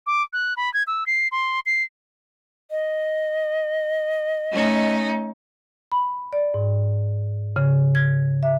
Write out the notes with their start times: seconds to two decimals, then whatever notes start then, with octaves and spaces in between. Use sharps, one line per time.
0.07 D6
0.33 F#6
0.57 B5
0.74 G#6
0.87 E6
1.07 C7
1.32 C6
1.66 C7
2.71 D#5
4.52 A3 C#4 D#4
5.92 B5
6.33 D5
6.54 G#2
7.56 C#3
7.95 G#6
8.43 E5